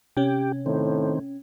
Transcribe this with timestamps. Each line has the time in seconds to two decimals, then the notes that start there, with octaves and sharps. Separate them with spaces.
0.17 C3 C#4 G4
0.66 A2 D#3 C4